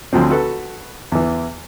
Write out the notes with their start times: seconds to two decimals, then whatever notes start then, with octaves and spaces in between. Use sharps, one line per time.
0.13 D2 F3 F#3 C4
0.30 F#4 A4 B4
1.12 E2 E3